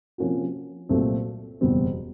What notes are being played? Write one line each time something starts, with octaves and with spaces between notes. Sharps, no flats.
C3 F3 A#3 C#4 F#4
C2 A#2 F#3 A3 C4
F#1 E2 B2 G3 C4